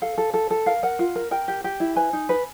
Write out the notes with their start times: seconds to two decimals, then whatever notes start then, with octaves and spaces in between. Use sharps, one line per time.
0.01 A4 F5
0.18 A4
0.34 A4
0.51 A4
0.66 A#4 F5
0.83 A#4 F#5
0.99 F4
1.15 A#4
1.31 A#4 G5
1.48 G4
1.64 G4
1.80 E4
1.96 B4 G#5
2.13 D#4
2.29 B4